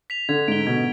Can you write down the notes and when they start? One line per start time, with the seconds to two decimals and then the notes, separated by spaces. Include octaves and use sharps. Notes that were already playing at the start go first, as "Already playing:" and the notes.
0.10 B6 F7
0.29 D3 G#6
0.48 G#2 D7 G7
0.67 B2 G#6